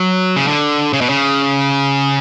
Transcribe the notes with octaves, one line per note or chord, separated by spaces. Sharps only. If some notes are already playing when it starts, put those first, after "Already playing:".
Already playing: F#3
C#3
D3
C#3
B2
C#3